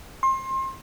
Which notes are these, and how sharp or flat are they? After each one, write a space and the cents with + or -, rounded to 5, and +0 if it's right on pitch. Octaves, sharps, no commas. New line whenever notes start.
C6 +30